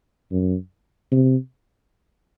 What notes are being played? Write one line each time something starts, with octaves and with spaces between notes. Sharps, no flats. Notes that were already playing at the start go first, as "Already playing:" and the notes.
F#2
C3